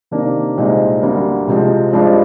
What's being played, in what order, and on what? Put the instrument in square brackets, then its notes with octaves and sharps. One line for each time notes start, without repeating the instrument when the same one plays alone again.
[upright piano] C3 D#3 A#3 D4
C2 A#2 G#3 C4 D#4
D2 D3 G3 A#3
C2 C3 F3 G#3 C4
G2 F3 G#3 D4